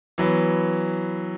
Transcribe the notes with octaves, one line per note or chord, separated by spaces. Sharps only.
E3 F#3 B3